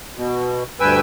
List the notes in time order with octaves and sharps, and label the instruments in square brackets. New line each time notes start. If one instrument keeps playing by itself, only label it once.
[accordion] B2
D2 G2 B4 G5 G#5 E6